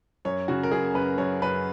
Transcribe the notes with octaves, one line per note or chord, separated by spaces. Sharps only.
F#2 C#5
C#3 F#4
A#4
F#2 G#4
F#2 B4
F#2 C#5
F#2 B4